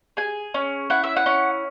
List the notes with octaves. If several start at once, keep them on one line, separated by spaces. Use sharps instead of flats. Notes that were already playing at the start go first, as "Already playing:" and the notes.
G#4 G#5
C#4
E4 F#5
E5
F#5
C#4